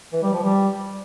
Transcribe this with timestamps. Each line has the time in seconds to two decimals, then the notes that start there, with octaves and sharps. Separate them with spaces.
0.13 E3
0.23 G3
0.33 F3
0.44 G3